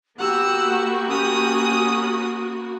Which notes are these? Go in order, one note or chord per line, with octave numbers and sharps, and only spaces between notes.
A#3 B3 F#4 G4 F#5 E6
C#4 D#6